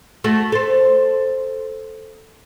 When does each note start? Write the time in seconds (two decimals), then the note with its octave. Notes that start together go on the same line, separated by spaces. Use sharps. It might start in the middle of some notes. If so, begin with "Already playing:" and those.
0.24 A3 F#4
0.52 A4 C5